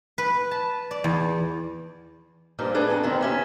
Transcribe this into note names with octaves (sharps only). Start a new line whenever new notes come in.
B4
A5
D5
E2
G2 A#2 F3 D#4
A3 D4 G#4 A4 B4
F2 D3
B2 D#3 C4
D#2 C#4 E5